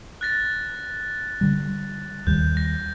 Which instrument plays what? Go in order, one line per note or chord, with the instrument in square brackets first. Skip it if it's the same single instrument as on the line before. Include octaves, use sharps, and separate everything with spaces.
[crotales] F#6 A6 A#6
[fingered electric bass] D3 G3
[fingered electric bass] D#2 D#3 G3 [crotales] G6
[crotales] A#6